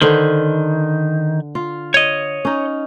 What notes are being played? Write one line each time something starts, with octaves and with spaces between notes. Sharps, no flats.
D3 D#3 B4 C5
F4
C#5 D#5
C#4 D#4